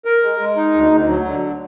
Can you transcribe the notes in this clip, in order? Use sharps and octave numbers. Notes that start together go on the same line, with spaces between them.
A#4
G#3
G#3
D#4
D2
D2
F#3
D3